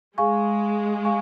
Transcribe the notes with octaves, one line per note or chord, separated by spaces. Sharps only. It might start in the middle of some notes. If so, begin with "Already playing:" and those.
G#3 G#4 F5 G#5 C#6
F5 G#5 C#6